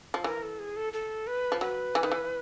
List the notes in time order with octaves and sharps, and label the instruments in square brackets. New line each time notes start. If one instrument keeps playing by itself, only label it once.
[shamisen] F3
[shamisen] E3 [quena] A#4
[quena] A4
G#4
A4
A4
B4
[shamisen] F3
[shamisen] F#3 [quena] B4
[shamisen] E3
D#3
E3